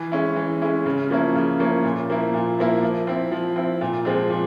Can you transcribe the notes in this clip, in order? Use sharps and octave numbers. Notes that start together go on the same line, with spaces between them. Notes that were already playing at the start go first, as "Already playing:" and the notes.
Already playing: E3
G#3 C#4 E4
E3
G#3 C#4 E4
C#3
F3 A#3 C#4 E4
C#3
F3 A#3 C#4 E4
A#2
F3 A#3 E4
A#2
F3 A#3 E4
F3
C4 E4
F3
C4 E4
A#2
F3 G#3 C4
A#2